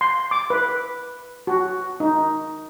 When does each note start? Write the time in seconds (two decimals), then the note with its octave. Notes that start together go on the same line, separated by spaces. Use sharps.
0.01 C6
0.31 D6
0.50 B4
1.47 F#4
2.00 D#4